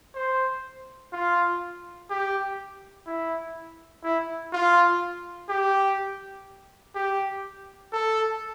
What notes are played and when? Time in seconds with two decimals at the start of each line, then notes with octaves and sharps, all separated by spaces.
0.15 C5
1.13 F4
2.10 G4
3.07 E4
4.04 E4
4.53 F4
5.49 G4
6.95 G4
7.93 A4